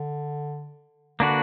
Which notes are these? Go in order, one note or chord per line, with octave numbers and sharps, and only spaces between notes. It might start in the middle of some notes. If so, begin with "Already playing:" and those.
Already playing: D3
D3 A#3 D4 F#4 B4